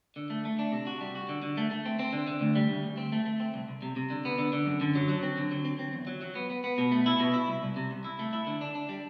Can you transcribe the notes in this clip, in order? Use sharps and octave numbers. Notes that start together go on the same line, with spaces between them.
D3
A3
A3
D4
C3
F#4
G3
F#4
D3
D3
A3
A3
C4
C4
D3
D3
D2
G3
D2
D2
C4
A3
A3
C4
C2
C2
C3
C3
D3
B3
D3
D3
F#2
D3
F#3
F#3
C4
D3
F#3
C4
C4
E2
F#3
F#3
B3
B3
B3
B2
A3
E4
B2
E4
C2
C2
C3
C2
E4
A3
E4
D3
D4
D4
G3